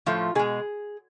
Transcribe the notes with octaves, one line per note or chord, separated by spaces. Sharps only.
A2 F3 A3 F4
B2 G#3 G#4